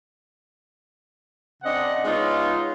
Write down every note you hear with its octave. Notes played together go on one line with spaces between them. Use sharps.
C#3 C4 D4 D#5 F#5
G#3 B3 C#4 D#4 F4